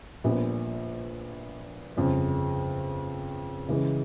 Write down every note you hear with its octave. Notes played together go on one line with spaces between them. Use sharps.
A#1 A#2 G3 B3
G1 F2 C#3
C#3 E3 G#3